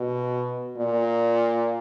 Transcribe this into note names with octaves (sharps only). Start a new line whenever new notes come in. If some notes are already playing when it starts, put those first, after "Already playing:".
Already playing: B2
A#2